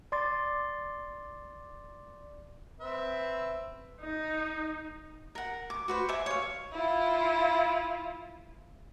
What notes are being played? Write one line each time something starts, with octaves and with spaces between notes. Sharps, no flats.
D5 C6 D6 A6
C4 B4 E5
D#4
A#4 F#5
D6
F#4 B4 C5
C5 E5 G#5 D6
C#5 F5
E4 F4